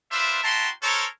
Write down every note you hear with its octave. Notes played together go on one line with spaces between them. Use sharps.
D4 F4 B4 C5 E5
E4 F#4 G5 A5 A#5 C6
C#4 A4 A#4 C5 C#5